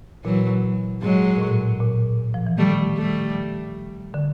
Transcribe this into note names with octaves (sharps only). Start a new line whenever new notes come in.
A#2 E3 F#3
G#2 F#3 G#3
A#2
A2
A#2
F3
E3
D#3 G3 A3
G3 A3
D3